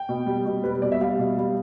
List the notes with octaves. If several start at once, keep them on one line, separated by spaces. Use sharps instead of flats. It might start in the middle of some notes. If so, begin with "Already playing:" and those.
Already playing: G5
B2
G3
B2
G3 B4
B2 D5
E5
G3 F5
B2
G3